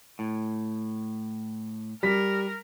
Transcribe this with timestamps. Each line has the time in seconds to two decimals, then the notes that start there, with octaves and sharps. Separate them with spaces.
0.19 A2
2.03 G3 A#4 B6